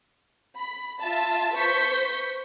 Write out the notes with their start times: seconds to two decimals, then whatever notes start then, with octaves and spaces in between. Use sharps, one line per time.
0.56 B5
1.00 F4 E5 A5
1.56 B4 C5 C#6 G6 B6